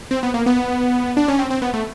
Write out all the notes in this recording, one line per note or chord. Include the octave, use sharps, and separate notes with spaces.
C4
B3
A#3
B3
D4
C#4
C4
C4
B3
A3